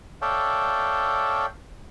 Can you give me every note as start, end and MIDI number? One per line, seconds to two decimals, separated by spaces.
0.22 1.46 69
0.22 1.46 73
0.22 1.46 74
0.22 1.46 76
0.22 1.46 77
0.22 1.46 79